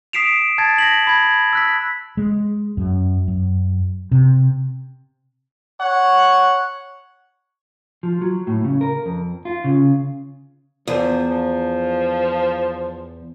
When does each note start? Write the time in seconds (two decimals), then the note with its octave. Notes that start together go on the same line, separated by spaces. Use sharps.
0.13 D#6 B6 C7 D7 E7 F7
0.58 A5 G#6 A6
0.78 A#6 B6 F#7
1.07 B5 G#6
1.53 E6 F#6 B6
2.17 G#3
2.77 F#2
3.28 F#2
4.11 C3
5.81 C#5 F#5
8.03 F3
8.21 F#3
8.47 A2
8.65 C#3
8.81 A#4
9.06 F2
9.45 F4
9.64 C#3
10.87 E2 F3
11.30 F3